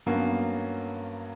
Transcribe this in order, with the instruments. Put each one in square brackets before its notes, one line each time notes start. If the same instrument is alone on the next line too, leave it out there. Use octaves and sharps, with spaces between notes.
[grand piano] G2 F#3 A#3 B3 C#4